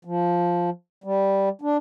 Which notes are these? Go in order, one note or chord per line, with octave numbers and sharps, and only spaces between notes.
F3
G3
D4